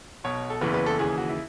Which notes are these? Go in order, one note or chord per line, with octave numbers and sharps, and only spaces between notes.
B1 B2 C#5
A4
F#1 E2 C#3 E3 B4
B4
A4
D#2 C#3 E3 G#4
F#4
E4